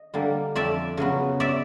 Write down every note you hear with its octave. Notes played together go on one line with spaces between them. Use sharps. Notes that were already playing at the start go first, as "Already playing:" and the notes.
Already playing: D#5
D3 G3 A#3
F2 D5 E5
C#3 F#3 B3
D5 E5